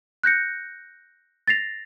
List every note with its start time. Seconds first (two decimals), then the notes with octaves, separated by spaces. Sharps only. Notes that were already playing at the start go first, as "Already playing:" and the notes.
0.23 F#6 G6 A#6 C#7
1.47 A6 A#6 C7 F7